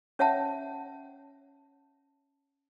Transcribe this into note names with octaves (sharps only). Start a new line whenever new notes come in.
C#4 C#5 E5 F#5 A5